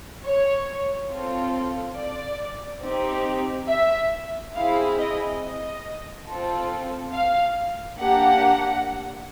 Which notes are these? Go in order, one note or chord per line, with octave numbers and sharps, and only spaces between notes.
C#5
C4 F4 A4
D5
C4 D#4 G4
E5
C4 E4 G#4 F5
D#5
D#5
C4 F4 A4
F5
A#3 D4 G4 F#5